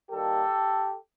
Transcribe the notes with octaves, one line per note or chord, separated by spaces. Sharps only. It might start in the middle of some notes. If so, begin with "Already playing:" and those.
D#2 D#3 G3 A#3 G4 A4